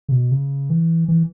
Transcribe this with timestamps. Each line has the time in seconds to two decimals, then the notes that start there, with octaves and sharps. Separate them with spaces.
0.09 C#3
0.12 B2
0.31 C#3
0.70 E3
1.08 E3